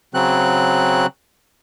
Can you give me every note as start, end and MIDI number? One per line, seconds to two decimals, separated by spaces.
0.14 1.06 49
0.14 1.06 54
0.14 1.06 60
0.14 1.06 90